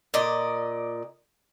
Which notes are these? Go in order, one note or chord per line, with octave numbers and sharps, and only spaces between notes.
A#2 D5 D#5